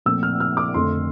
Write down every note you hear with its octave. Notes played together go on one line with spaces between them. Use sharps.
A#2 F3 A3 C4 E6
F6
F6
D6
F2 D3 F3 A3 C6